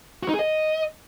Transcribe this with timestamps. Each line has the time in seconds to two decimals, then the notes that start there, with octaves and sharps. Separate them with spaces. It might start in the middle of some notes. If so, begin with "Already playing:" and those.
0.23 F#4
0.28 D#4
0.34 G#4
0.39 D#5